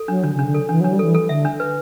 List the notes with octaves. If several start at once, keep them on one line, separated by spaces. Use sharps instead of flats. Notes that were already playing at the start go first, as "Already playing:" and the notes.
Already playing: A4
F#3 D4
D3 D4
C#3 D4
D3
A4
E3 D4
F#3 D4
G3
E3 A4
A4
D3 E5
D4
B4